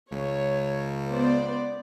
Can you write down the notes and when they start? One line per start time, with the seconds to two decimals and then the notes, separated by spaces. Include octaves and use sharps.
0.12 C#2 C#5
1.10 B3 C5 D5